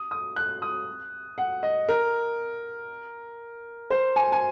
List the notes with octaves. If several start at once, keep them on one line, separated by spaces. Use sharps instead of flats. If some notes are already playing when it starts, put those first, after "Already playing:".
Already playing: D#6
D#6
F#6
D#6
F#5
D#5
A#4
C5
G#5
G#5